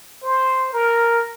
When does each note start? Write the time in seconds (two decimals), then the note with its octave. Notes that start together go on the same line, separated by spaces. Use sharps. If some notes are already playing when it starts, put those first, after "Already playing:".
0.23 C5
0.73 A#4